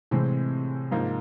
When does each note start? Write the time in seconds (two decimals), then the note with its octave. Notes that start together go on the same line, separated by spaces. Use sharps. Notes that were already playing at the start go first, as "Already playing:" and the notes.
0.11 A2 C3 E3 G#3 C4
0.91 G#2 F3 A#3 D#4